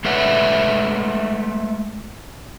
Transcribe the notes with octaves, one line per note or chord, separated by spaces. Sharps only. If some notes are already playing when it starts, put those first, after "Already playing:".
G#3 A3 B4 C#5 E5 F#5